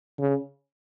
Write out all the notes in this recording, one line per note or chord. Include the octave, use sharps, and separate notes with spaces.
C#3